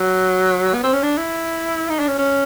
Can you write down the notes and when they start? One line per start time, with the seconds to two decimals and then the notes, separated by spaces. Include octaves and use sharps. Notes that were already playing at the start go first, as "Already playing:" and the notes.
Already playing: F#3
0.73 B3
0.83 C4
0.93 C#4
1.03 D4
1.17 E4
1.89 D#4
1.99 D4
2.08 C#4
2.18 C#4